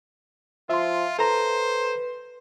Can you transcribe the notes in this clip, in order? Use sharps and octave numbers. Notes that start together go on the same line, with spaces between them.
F3 F4 E5 C6
A4 B4 C5 A#5